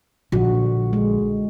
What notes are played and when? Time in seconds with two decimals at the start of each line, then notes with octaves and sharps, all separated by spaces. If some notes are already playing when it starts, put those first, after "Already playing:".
0.32 A#1 D3 F#4
0.93 G#3